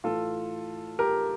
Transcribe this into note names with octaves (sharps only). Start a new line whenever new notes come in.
A2 E3 F4 A4
G4 A#4